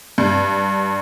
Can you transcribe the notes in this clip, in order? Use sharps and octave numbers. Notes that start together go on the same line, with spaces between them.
G2